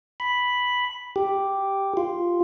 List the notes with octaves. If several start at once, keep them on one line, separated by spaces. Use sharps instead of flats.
B5
G4
F4